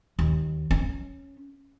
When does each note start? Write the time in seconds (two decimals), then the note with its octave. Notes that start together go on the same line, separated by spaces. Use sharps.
0.19 D#2
0.71 C#4